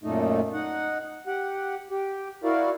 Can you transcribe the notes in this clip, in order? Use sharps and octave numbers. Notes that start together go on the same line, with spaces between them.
F#2 A#2 A3 D#4
D#4 F#5
G4 F#5
G4
E4 F#4 A#4 D5 F5